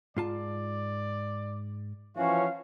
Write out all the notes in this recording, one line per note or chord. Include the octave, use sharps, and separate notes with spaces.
G#2 F4 D5 A5
E3 F3 C#4 F#4 F5